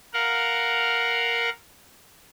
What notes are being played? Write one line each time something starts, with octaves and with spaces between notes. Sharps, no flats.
A#4 F5 F#5